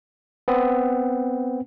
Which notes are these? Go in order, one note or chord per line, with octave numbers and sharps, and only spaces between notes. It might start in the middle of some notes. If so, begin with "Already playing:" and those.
B3 C4